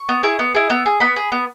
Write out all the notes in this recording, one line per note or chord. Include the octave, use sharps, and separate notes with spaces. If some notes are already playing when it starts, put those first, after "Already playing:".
Already playing: C#6
B3
E4 G#4
B3
E4 G#4
B3 E6
G#4
B3 B5
G#4
B3